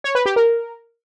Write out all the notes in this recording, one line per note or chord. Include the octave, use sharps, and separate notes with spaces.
C#5
B4
G4
A#4